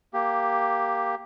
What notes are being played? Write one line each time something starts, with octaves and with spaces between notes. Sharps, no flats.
A#3 G4